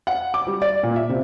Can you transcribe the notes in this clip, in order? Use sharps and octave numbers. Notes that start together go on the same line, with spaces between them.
F#5
D6
G3
D5
A#2
E5
C3